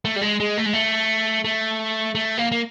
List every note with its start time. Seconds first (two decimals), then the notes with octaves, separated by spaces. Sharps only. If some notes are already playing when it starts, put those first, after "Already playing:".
0.05 A3
0.16 G3
0.21 G#3
0.40 G#3
0.57 A3
0.66 G#3
0.73 A3
1.44 A3
2.15 A3
2.38 A#3
2.52 A#3